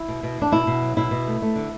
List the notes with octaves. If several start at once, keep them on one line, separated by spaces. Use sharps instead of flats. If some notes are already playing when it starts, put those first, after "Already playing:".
Already playing: E4
B2
B2
E2 D4
B2 E4
B2
F#3
B2 E4
B2
A3
A3
D3